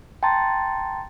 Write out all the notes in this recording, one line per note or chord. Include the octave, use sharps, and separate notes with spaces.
G5 A5 A#5 C6 A6